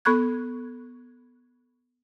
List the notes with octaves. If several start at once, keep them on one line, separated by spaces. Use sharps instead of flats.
B3 A4 B5 C#6 F#6 G#6